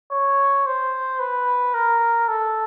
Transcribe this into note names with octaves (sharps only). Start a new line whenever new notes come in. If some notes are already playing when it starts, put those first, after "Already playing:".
C#5
C5
B4
A#4
A4